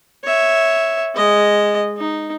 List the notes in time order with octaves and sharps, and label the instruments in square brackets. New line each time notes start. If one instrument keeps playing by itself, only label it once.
[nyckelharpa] C#5 E5
G#3 D#5
D#4